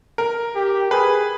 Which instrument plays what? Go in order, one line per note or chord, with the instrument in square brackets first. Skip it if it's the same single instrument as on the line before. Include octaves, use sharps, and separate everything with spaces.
[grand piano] A#4
[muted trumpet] G4
[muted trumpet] G#4 [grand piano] B4